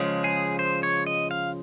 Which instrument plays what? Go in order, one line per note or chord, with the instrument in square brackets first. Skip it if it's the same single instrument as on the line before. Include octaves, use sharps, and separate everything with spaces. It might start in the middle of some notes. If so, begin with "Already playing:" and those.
Already playing: [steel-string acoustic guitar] C#3 F3 G#3
[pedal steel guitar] G#4
C5
C#5
D#5
F5